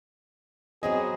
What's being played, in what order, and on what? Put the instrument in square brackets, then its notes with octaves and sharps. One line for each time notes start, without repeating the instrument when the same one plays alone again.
[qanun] F#3 B3 C4 [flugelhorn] G#4 [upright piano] D#5